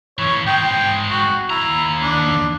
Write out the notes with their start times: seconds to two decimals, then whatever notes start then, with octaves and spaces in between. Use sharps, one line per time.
0.19 E3 C#4 C#5
0.47 G#3 C4 G5
1.10 F#4
1.50 D#2 E4 A#5
2.02 D4